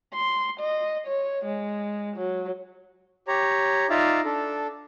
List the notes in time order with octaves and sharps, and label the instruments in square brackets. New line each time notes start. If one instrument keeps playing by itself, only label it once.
[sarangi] C6
D#5
C#5
G#3
F#3
[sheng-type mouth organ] G4 C#5 A#5
D#4 F4 D5 E5 F5 A#5
D4 A4